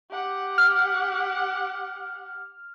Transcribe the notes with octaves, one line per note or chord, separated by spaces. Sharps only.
G4 F#5
F6